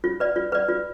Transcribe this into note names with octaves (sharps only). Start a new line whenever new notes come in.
F4
B4 D5
F4
B4 D5
F4